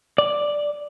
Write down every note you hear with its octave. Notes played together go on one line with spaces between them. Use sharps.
D5